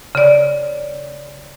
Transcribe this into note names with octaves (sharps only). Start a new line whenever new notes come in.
C#3 D5